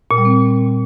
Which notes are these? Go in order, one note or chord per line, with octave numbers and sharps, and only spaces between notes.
A#2
G3
C4